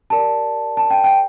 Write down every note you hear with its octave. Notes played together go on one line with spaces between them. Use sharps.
G4 A#4 D5 A5
A5
G5
G5